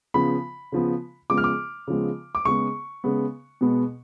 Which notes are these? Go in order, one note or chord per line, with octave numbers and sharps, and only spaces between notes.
C#3 F3 B3 B5
C#3 F3 B3
C#3 F3 G#3 B3 D6
F6
D6
C#3 F3 G#3 B3
D6
C#3 G#3 B3 C#6
C#3 G#3 B3
B2 G#3 B3